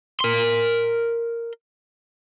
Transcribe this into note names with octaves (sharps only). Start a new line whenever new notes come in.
A#4 C6